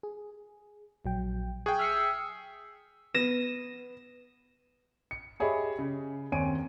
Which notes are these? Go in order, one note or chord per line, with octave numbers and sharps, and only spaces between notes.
G#4
A#1 F#3 G5
G#4 G5 C#6 F#6 G#6
E5 F6 C7 C#7
B3 A#6 D#7 E7
C#7
G4 G#4 C#5 D#5 E5 B5
C#3
D#2 C4 C#5 G#5 D7 D#7